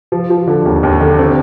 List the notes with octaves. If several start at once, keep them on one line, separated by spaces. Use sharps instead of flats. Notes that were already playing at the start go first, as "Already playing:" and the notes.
F3
F3
D3
D#2
D#2
D3
C4